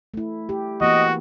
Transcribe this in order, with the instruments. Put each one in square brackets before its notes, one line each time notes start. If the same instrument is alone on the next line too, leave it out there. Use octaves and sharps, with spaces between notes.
[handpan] A3 E4
G4
[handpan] E3 A#3 B3 [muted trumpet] F#4 [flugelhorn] D#5